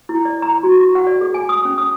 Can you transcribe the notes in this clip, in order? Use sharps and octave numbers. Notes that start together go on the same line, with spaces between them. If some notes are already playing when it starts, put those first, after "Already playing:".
E4
D5
A#5
F#4
C#6
F#5
D5
G#4
G#5
D#6
C#4
D#6